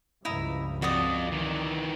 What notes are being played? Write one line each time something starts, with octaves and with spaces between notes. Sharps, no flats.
C#2 G2 F3 E4 D#5 A#5
F2 F#4 D5 D#6
D#3 E3